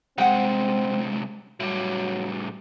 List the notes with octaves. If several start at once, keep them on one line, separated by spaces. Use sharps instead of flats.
C2 G#3 C4 F#5 G5
A2 F#3 G3